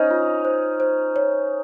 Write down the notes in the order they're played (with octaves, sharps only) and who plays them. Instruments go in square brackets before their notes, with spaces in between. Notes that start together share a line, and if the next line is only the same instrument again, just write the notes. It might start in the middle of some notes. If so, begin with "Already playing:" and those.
Already playing: [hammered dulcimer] C#4 D#4 [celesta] C5
[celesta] F4
C5
C5
C#5